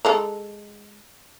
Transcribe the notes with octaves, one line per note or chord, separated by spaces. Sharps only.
G#3 A4 A#5